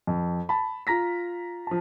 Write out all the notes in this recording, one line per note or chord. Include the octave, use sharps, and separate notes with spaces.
F2
A5 B5
F4 A#5 A#6 B6
F3 A5